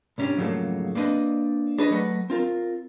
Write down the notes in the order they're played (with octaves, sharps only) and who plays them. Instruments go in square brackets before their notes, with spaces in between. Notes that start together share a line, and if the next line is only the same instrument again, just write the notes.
[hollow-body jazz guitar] C2 G#2 C#4 D4 G4
F2 G#2 C#3 F#3 A3 A#3
A#3 C4 D4 B4 D#5
D4 G#4 B4 C#5 D#5
F#3 A3 B4 D#5 F#5
C4 F4 A#4